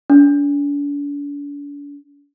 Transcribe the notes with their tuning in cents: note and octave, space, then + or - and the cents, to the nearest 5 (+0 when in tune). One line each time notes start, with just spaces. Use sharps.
D4 -40